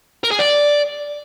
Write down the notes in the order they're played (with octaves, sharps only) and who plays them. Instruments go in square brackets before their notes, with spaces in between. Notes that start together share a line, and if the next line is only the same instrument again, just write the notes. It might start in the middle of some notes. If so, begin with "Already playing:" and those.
[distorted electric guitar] A#4
G#4
D5